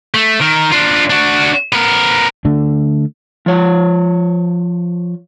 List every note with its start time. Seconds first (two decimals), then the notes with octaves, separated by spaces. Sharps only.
0.14 A3
0.41 D#3 A#4
0.72 D4 F4
1.10 D4 F#4
1.73 B3 A#4
2.45 D3 A3 D4
3.46 F3 C#5